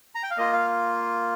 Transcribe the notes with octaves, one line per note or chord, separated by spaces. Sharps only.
A#5
G5
F5
A#3 F4 D#5
F5